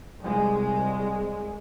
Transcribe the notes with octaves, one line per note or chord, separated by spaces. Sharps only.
C2 G#3